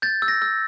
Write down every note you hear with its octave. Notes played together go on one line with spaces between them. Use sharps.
G6 A6
E6
A#6
E6